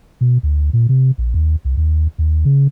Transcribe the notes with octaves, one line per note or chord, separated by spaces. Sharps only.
B2
D2
A#2
C3
A#1
D#2
C2
D#2
D#2
C#3